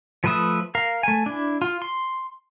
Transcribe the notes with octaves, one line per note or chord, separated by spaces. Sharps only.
F3 A3 B4 E5 D#6
A#4 F5
A3 G#5
D4 E4
F4
C6